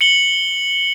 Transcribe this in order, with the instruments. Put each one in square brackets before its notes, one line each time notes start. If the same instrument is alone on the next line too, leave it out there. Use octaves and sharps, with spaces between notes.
[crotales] C#7 F#7 G7